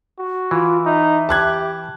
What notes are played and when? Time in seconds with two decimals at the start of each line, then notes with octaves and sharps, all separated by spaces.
0.18 F#4
0.51 E3 F4
0.86 D#4 E5
1.29 G4 A5 F#6 G#6